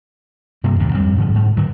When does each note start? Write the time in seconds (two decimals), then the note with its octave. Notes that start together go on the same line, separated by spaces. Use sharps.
0.64 G2 C3 G3 A#3
0.80 A1 D#2 A2 D3
0.94 F2 G3 C4
1.16 G#2 D3 F3
1.34 G#2
1.57 D3 D#3 F#3